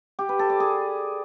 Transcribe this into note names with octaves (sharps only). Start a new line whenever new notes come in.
G4
B4
A4
D5
G#4